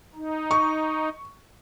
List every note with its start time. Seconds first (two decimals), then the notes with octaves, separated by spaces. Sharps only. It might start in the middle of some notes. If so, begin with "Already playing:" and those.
0.15 D#4
0.51 C#6